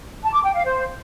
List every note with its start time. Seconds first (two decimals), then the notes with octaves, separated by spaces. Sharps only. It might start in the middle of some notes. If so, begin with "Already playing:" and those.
0.23 A5
0.34 D6
0.44 G5
0.54 F5
0.65 C5